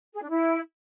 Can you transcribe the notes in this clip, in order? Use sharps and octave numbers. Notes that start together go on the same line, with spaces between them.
G#4
D4
E4